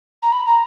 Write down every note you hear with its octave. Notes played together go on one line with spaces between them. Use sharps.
A#5
B5
A#5